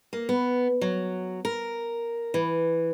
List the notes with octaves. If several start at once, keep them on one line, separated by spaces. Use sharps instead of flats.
A#3
B3
F#3
A#4
E3